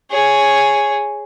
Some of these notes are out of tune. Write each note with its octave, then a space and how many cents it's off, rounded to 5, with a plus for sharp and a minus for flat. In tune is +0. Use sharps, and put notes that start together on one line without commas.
G#4 +0 C#5 +0